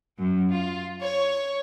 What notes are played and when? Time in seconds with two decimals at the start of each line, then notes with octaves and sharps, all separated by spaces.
0.18 F#2
0.51 F4
1.02 C#5